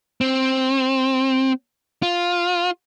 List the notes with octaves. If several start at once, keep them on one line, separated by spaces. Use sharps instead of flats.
C4
F4